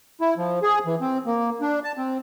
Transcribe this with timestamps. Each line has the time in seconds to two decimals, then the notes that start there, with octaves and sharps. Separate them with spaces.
0.21 E4
0.37 F3
0.62 G#4
0.86 E3
1.01 C4
1.26 A#3
1.61 D4
1.84 A5
1.97 C4